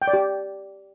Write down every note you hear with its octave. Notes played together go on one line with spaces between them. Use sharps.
G5
D5
G4